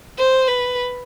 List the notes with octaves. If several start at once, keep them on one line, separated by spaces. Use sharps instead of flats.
C5
B4